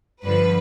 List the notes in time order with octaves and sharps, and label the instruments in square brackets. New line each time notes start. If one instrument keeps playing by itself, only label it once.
[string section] G2 D3 F3 B4